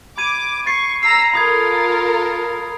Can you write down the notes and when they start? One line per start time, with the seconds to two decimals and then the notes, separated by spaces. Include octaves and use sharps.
0.18 B5 D6 G#6 D#7
0.66 C#6 A6 C7 C#7
1.03 A#5 E6 C7
1.33 F4 A4 A#4 B5 D#6 G#6